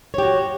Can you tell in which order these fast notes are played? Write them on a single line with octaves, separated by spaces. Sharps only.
C#5 G4 F#4